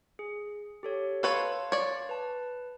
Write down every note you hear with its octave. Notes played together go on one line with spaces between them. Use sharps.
G#4
G4 A4 C#5
A4 B4 C#5 F5 A5 C6
C#5 D5
B4 A5